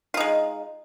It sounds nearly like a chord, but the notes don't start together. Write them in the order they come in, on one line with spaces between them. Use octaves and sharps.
F4 D#4 G#3